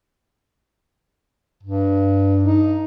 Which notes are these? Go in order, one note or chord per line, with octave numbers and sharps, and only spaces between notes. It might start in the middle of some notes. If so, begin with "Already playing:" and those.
G2
D#4